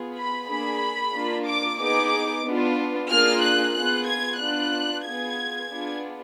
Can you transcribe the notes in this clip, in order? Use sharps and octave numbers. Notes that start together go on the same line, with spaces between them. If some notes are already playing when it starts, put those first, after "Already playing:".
Already playing: B3 F4 G#4
B5
A#3 D4 G#4 B5
A#3 D4 F4
D6
B3 D#4 G#4 D6
B3 D4 F4
A#3 D4 F4 G#4 F6
F#6
B3 F4 G#4 F#6
G#6
B3 D4 F4 F#6
B3 F4 G#4 G#6
B3 D4 F4 G#4